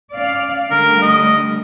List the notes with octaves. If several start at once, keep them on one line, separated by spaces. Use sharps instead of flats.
C#4 D5 F5
D3 G3 A3 A#4
D#5